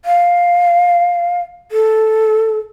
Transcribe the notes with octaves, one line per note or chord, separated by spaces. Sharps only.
F5
A4